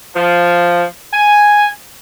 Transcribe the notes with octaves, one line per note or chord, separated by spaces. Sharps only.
F3
G#5